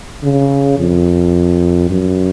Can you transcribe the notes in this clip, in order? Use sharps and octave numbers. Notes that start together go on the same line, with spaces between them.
C#3
F2
F#2